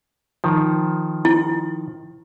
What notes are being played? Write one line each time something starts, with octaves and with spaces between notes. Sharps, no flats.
D#3 F3
E4